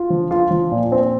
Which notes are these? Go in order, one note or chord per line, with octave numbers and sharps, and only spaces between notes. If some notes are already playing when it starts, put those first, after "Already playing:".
Already playing: F4
F3
F4
F3
A#2
C4